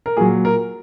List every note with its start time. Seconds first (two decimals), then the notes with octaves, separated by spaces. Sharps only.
0.06 A#4
0.17 A#2 F#3 G#4
0.45 A#4